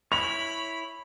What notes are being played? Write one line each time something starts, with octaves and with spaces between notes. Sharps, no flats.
E4 C#5 B5 F7